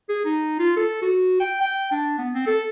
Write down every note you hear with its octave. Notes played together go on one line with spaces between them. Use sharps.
G#4
D#4
F4
A4
F#4
G5
G5
D4
B3
C4
A4